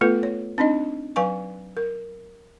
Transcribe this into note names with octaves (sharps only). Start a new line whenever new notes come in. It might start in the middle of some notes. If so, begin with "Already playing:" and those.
A3 B3 F4 A4 B4
C#5
C4 D4 D#4 D#5
F#3 B4 F5 G#5 C#6
A#4